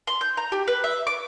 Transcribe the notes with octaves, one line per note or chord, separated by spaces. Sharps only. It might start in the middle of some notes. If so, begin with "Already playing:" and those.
C6
G6
A#5
G4
B4
E5
D6